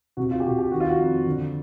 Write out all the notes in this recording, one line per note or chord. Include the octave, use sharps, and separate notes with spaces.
C3 F#4
F4
G4
C3 F#4
G4
D#3 F#4
F4
F#4
F2
D3